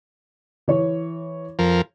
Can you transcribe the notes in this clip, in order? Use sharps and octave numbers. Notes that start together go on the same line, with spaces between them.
E3 C#5
F2 F3 A#4